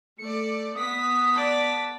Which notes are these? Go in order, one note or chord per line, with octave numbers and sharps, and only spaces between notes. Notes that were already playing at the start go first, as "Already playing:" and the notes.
A3 D5 C#7
B3 D#6 B6
D5 A5